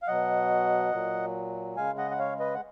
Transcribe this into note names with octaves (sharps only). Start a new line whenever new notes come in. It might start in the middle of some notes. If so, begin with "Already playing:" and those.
F5
B2 F#3 D#5 F#5
A#2 F#3
C#3 G#3 F5 G#5
D#5 F#5
F#5
C#5 F5
B4 D#5
F#5